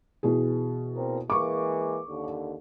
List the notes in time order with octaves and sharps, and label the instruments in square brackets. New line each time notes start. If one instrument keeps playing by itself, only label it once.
[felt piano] B2 E3 G#4
[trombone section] A#2 C4 A#4
[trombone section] E3 G#3 A#3 [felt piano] C#6 D6
[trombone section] D#2 D3